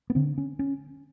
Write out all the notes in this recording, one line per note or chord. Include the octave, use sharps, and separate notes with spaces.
B3
D3 C4
C#4
C#4